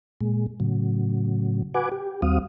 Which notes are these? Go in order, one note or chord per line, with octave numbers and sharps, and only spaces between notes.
A#2 G#3
A2 C#3 F#3
F#4 B4 F#5 G#5 D6
G4
D#2 G3 C4 F#4 F5 D#6